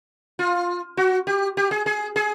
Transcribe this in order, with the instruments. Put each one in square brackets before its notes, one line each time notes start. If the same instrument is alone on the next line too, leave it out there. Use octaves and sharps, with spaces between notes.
[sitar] F4
F#4
G4
G4
G#4
G#4
G#4